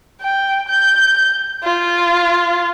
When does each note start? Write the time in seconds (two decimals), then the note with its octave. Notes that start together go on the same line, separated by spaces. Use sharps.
0.22 G5
0.69 G6
1.63 F4